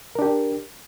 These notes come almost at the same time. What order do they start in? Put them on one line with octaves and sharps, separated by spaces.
A#4 D4 G4